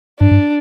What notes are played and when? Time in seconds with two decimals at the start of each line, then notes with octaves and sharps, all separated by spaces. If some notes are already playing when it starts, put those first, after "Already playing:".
0.20 G2 D4
0.31 G2